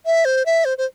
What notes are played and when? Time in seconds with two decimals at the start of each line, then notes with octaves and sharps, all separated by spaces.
0.06 E5
0.25 C5
0.46 E5
0.65 C5
0.78 C5